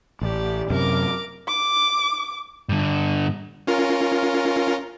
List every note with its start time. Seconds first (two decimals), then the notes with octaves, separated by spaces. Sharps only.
0.21 A1 G4 D5
0.70 F#2 C3 A#4 D6
1.48 D6
2.69 G2 D3
3.67 C#4 F4 A#4